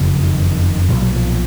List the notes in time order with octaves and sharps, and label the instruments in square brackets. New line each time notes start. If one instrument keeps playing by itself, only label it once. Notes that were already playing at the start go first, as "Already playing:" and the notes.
Already playing: [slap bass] F#1 F2 C#3
D#3
B1 A#2 F3
F#3
F3